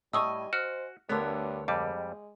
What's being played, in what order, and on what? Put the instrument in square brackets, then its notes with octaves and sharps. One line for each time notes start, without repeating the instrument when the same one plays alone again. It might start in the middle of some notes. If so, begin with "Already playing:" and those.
[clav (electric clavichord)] A2 [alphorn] G3 [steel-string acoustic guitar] D#5 G#5 [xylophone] C#6 D#6 E6
[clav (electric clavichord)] F#4 [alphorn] C5 [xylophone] F6
[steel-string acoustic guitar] D2 A#4 C#5 [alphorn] G2 [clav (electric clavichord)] D3 B3
[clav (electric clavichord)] F2 G3 [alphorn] G#3 [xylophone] D6